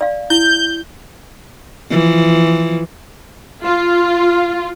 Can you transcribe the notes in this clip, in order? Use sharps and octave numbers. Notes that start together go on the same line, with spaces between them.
D5 F5
E4 G6
E3 F3
F4